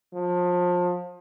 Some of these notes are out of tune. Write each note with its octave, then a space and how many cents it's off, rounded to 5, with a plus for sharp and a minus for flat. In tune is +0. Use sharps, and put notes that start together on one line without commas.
F3 +30